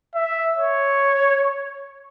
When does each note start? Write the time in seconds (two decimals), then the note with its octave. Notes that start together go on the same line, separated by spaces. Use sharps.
0.15 E5
0.58 C#5